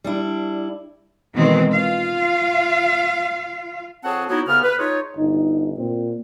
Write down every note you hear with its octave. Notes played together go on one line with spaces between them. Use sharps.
G3 D4 E4
B2 D#3 E3 G#3 C4
F4 F5
F2 C4 G#4 C#5 F#5 A5
F#3 B3 D#4 E4 F#4 C#5
C2 C#3 B3 F6
B4
D#4 F4 G#4 C#5
G1 D#4
A#2 C4